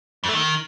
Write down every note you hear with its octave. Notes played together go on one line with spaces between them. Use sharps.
F2
A3
D#3